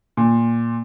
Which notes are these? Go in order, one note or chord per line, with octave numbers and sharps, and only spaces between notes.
A#2